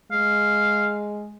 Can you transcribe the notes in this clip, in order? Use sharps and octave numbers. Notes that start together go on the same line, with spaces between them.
G#3 F5